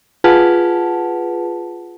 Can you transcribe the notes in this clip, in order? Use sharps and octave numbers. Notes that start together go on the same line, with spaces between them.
F4 G#4 B4 F#5 A5